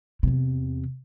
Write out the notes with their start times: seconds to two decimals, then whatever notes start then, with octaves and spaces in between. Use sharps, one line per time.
0.23 E2 C3